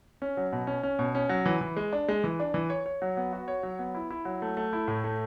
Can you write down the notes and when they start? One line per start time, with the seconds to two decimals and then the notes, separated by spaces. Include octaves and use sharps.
0.22 C#4
0.37 F#3
0.53 B2
0.67 C#4
0.83 C#4
0.99 B2
1.15 C#4
1.29 F#3
1.46 E3
1.61 E3
1.77 G#3
1.93 D4
2.08 G#3
2.24 E3
2.40 D4
2.54 E3
2.70 C#5
2.86 C#5
3.02 F#3
3.17 B3
3.33 F#4
3.48 C#5
3.63 F#3
3.79 B3
3.95 E4
4.11 E4
4.25 F#3
4.42 A3
4.57 A3
4.73 E4
4.88 A2
5.04 A3